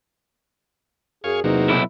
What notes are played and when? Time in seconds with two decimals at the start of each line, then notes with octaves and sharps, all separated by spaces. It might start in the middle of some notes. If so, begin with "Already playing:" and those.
1.24 F#2 G#4 C#5 F5 G#5
1.44 E2 C3 F#3 A#3 D#4
1.70 B1 E4